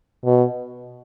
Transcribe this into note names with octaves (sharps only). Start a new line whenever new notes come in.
B2